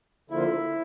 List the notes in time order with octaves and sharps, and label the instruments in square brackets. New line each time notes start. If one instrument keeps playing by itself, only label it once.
[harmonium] D3 F3 A#3 F4 [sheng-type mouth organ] E4